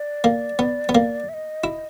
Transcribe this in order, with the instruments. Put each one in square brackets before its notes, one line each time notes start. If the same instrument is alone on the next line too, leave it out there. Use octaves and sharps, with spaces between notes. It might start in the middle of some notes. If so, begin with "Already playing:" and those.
Already playing: [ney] D5
[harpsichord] A#3
B3
B3
A#3
[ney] E5
D#5
[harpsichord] E4